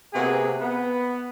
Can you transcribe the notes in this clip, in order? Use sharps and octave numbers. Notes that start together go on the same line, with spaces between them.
C3 A#3 B3 F#4 G#4
B3